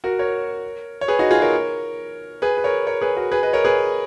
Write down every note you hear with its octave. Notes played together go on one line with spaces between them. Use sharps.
F#4 A#4
A#4 C#5
C#5
G#4 B4
D#4 F#4
F4 G#4
A#4 C#5
G#4 B4
B4
A#4 C#5
A#4 C#5
G#4 B4
F#4 A#4
G#4 B4
B4 D#5
A#4 C#5
G#4 B4